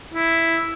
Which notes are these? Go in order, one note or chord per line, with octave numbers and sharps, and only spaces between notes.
E4